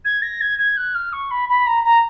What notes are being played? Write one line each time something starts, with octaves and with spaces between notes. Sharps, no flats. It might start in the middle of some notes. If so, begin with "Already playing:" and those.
G#6
A#6
G#6
G#6
F#6
F6
C#6
B5
B5
A#5
A#5